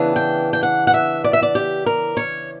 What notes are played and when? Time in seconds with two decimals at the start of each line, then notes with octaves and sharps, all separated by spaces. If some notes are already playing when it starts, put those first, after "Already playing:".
Already playing: C#3 E3 B3 D4
0.16 G5
0.53 G5
0.63 F#5
0.87 F#5
0.94 E5
1.24 D5
1.33 E5
1.42 D5
1.55 G4
1.86 A#4
2.17 C#5